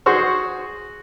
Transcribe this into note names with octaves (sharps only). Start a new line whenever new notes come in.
F#4 G#4 C5 C#6